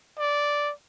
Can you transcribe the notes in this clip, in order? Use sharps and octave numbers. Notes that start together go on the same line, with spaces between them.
D5